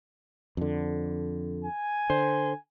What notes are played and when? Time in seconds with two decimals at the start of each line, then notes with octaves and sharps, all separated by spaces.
0.57 F2 D3
1.65 G#5
2.10 D3 C5